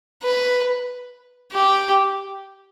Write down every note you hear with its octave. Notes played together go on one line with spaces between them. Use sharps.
B4
G4